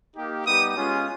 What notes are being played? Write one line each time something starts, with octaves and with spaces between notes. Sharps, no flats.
A#3 D#4 G4
G3 B3 D#4 G4 D#6
G#3 C#4 F4